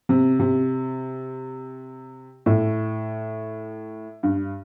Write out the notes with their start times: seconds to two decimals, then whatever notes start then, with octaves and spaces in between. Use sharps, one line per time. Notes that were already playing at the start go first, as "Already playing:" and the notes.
0.09 C3
0.39 C3
2.46 A2
4.23 G2